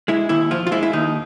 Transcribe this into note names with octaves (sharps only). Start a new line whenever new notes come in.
G#3 E4
D#2 E4
F3 F4
F4
G#3 E4
E4
D#2 D#4